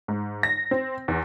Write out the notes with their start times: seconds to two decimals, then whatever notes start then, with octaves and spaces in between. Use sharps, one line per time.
0.08 G#2
0.43 A#6
0.71 C4
1.08 E2